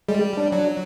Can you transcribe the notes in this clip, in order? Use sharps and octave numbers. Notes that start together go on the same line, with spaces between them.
G3 G#3
D4
F#3 D4